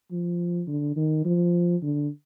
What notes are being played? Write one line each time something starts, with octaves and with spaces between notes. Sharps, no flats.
F3
D3
D#3
F3
D3